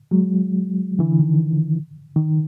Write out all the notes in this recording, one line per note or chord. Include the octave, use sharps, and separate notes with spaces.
F#3 G#3
D3 E3
D#3
D#3